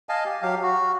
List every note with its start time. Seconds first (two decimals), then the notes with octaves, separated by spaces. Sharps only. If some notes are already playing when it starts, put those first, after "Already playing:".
0.09 D#5 F5 G#5 A5
0.25 G4
0.42 F#3 G4 F5
0.63 F#4